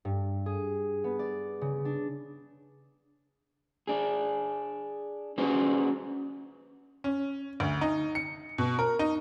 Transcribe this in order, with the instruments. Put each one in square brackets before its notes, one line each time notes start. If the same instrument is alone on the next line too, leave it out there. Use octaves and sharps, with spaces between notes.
[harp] G2
G#4
B3
D5
C#3
D4
[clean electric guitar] D4 G#4
C#4 D4 F#4 G#4 B4 C5
[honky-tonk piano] C#4
D2
D#4
C#7
B2
A#4
D#4